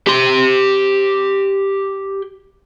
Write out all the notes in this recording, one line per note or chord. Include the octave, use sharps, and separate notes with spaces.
G4 C6